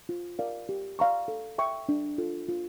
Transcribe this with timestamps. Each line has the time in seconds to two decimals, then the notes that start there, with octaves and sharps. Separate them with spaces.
0.09 F4
0.39 A#4 D5 F5
0.69 G4
0.99 D5 F5 A#5 C#6
1.28 A4
1.58 E5 G5 C#6
1.89 D4
2.18 F4 A4
2.49 F4